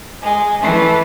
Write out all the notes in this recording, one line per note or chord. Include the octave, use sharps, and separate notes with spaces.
G#3
E3 A3